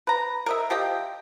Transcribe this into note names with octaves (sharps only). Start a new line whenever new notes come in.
B4 A#5
A#4 D#5 E5
F3 G4 D#5 G5